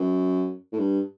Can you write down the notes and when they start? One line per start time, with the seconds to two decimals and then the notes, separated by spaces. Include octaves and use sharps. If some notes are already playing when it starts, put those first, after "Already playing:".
Already playing: F#2
0.73 A2
0.78 G2